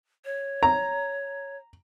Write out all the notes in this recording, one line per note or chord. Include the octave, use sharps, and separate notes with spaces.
C#5
A#5